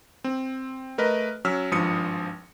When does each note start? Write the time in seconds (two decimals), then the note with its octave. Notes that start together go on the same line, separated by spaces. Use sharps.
0.24 C4
0.98 A3 A#4 B4 D#5
1.45 F#3 C#4 E6 F6 B6
1.71 G#1 G2 F3 D#6 C#7